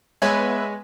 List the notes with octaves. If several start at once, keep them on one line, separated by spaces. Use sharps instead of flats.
G#3 B3 B4 C#5 E5 G#5